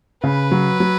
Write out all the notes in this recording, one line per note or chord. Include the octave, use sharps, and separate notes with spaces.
C#3 B4
F#3
F#3